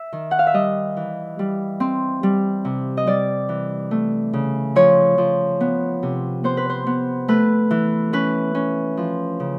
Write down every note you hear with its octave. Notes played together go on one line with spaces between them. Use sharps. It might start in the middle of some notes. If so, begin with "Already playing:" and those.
Already playing: E5
D#3
F#5
F5
E5
G3 D#5
E3
G3
C4
G3
C3
D#5
G3 D5
E3
A3
C#3
F3 C#5
F3
B3
C3
B3 C5
B4
C5
B3
A3 B4
E3
C#4 B4
C#4
F3
C#3